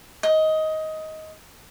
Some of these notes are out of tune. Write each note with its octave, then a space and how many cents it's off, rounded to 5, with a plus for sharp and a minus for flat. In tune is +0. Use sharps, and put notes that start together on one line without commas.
D#5 +15